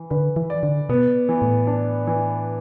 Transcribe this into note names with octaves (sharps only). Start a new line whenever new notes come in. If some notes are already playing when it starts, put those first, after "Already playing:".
Already playing: E3
D3 B4
E3
D5
D3
B2 B3
E3
A2
D4
E3